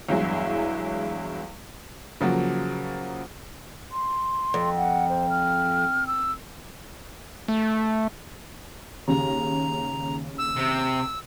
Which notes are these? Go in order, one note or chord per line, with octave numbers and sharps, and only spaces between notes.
E2 G2 F#3 G#3 E4
C#3 F3 F#3 A#3
C6
F2
F#5
C5
F6
E6
A3
D#2 C#3 A#5
E6
C3